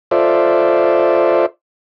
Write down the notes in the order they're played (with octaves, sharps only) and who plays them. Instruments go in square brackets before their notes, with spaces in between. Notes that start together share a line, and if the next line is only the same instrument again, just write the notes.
[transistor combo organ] F4 A4 C5 D5 E5